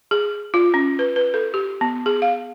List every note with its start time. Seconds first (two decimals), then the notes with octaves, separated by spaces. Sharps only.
0.11 G#4
0.54 F4
0.74 C#4
0.99 B4
1.16 B4
1.34 A4
1.54 G4
1.81 B3
2.06 G#4
2.22 F5